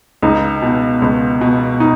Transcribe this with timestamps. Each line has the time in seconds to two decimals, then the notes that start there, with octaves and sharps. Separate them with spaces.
0.22 C#2 D#4
0.62 B2
1.02 C#2
1.41 B2
1.80 D#4